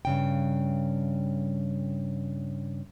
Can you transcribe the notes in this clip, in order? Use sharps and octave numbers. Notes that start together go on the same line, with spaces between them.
G2 C#3 G5